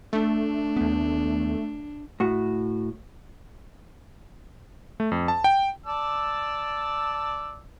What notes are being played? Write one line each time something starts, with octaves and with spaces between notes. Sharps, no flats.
A3 D4
D#2 B3
A2 F#4
A3
F2
A5
G5
D5 A5 E6